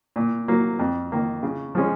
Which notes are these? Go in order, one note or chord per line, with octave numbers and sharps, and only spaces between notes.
A#2
F#3 A#3
F2
D#3 A#3
C#3
F3 G#3 C#4